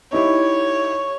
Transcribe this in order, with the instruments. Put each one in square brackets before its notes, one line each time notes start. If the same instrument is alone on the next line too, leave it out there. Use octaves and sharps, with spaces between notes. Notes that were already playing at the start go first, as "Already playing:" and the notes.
[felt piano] D#4 E4 G4 [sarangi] C#5